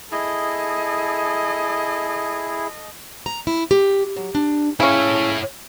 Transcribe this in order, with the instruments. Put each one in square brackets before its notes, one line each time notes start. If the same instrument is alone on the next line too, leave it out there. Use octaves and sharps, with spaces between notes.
[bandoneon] E4 G#4 [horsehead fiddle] A4 D#5
[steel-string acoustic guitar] A#5
E4
G4
F#3
D4
[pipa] C#3 C#4 [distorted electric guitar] E4 C#5